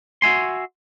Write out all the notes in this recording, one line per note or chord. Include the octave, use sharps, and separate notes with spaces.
F#4 E5 G#5 C6